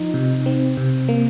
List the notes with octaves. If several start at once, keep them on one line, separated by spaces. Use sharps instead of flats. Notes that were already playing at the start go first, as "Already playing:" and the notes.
Already playing: F3 D#4
C3
C4
C3
A#3